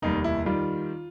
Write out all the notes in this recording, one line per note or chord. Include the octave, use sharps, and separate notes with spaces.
F1 D#2 D#3 G3 D#4
E4
D#3 G3 F4